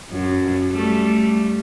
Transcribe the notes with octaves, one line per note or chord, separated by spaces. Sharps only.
F#2
G3 A3